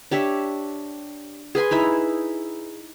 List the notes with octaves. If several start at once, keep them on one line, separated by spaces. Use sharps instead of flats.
D4 G4 C#5 E5
G#4 B4 G#5 C6
D#4 E4 E5